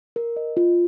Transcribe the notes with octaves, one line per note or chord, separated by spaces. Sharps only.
A#4
D#5
F4